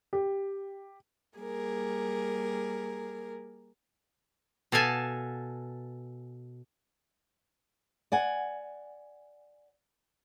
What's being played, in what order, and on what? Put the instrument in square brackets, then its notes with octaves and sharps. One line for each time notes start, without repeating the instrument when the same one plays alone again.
[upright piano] G4
[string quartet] G3 A#3 G#4 A#4
[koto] B2 A4 F5 G#5 A5
[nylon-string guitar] D5 F#5 G#5